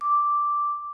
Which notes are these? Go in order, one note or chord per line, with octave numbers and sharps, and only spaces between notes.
D6